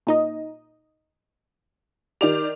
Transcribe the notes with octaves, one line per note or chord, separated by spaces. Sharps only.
A#2 D#4 D#5
D#3 G4 D5 F7